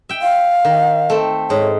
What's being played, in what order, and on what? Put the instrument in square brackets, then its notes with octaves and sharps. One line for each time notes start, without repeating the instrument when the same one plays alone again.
[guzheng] E5 G5
[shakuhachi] F5
[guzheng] D#3
A3 C4
[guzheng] G#2 [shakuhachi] C#5